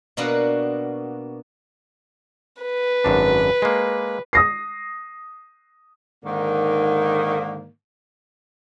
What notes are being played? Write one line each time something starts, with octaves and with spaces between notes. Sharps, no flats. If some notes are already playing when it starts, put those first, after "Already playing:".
B2 A#3 B3 D4 F#4
B4
G#1 F#2 D4
G#3 A#3
D#6 A#6 C7
G#2 D3 D#3 A#3